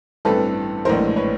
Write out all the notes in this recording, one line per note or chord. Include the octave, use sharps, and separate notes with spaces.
A1 G2 E3 A3 C4 A4 B4
A#1 A2 E3 G#3 A#4 C5
B4 C#5